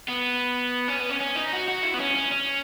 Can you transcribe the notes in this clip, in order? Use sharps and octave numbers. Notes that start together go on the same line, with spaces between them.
B3
C#4
B3
C#4
C#4
D#4
F#4
F#4
E4
B3
C#4
C#4
C#4